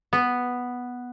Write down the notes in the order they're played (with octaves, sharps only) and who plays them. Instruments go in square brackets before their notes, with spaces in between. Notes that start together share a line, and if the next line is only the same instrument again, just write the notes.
[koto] B3